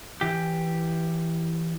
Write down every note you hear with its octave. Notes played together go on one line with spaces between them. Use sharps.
E3 G4